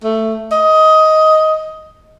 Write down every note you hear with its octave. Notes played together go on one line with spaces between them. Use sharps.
A3
D#5